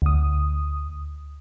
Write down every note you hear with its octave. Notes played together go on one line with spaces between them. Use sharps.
D2 D#6